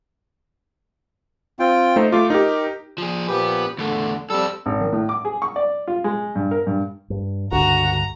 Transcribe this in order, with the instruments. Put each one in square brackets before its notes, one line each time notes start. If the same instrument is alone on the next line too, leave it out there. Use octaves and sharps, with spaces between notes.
[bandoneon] C4 F4 G5
[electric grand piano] A3 D#4 C5
[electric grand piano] A3 F4 [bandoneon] D6
[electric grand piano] D#4 G4 [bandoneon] A#4
[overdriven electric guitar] F3 G#4
[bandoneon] A#2 F3 G4 [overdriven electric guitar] B3 B4
[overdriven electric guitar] E2 A3 [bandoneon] D3
[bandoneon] G3 E6 [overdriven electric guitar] C4 A4
[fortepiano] G#1
D#3
A2
D6
G#4
C#6
D5
F4
G#3
G2
A#4
G2
[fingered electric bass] G2
[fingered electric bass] C#2 G2 D3 [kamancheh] F#4 [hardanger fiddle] A#5